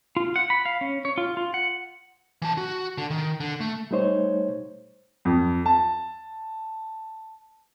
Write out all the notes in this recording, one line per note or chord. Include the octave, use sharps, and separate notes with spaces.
F4
F#5
B5
F5
C#4
C#5
F4
F4
F#5
E3 A5
F#4
D3
D#3
D3
A3
G3 A3 D#4 C5 C#5
F2
A5